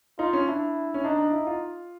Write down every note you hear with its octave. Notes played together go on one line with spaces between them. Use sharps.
D#4 F4
C#4
D4 E4
C#4
D4 D#4
D4
E4
F4